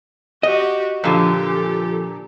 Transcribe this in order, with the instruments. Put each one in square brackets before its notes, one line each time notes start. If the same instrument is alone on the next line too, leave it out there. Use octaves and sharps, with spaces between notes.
[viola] F#4 G4 [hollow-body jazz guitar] D#5
[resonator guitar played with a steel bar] A#2 D3 [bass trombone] F3 [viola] G4 A4
[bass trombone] F3